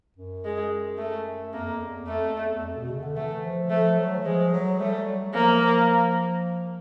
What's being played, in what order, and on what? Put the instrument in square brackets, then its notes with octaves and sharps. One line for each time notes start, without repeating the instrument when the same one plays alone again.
[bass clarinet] F#2
[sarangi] G#3
A3
[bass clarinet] F2 [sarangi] A#3
[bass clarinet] E2
[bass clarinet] F2 [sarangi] A3
[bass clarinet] E2
F2
B2
C#3
D3
[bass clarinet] E3 [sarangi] A3
[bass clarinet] F3
[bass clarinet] F3 [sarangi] A3
[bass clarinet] F#3
E3
[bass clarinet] F3 [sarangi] G#3
[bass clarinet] F#3
[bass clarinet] G3 [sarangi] A3
[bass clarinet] F#3
[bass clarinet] F3 [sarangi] A#3
[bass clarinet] F3